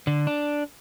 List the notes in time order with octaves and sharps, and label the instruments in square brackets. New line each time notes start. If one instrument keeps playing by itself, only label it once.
[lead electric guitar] D3
D4